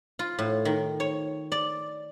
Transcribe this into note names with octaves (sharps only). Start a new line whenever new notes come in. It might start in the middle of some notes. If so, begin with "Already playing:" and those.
F4
A2
D#3
C#5
D5